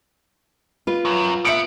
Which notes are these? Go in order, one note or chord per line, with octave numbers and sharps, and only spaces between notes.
F4 B4
F#2
B3 E5 C#7 D7